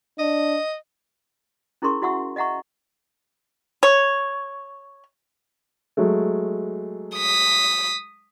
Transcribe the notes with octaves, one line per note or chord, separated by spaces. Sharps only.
D4 D#5
C#4 E4 G#4 A#4 C6 C#6
E4 F#4 E5 F#5 C#6 E6
D#5 E5 F#5 A#5 C#6
C#5
F#3 G#3 A3
D#6 B6